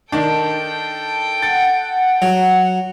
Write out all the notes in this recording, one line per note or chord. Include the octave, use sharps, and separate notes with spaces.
D#3 D4 A4 G5
F#5 A6
F#3